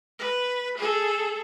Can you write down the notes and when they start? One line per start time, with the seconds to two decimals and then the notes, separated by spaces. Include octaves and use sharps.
0.19 B4
0.77 G#4 A4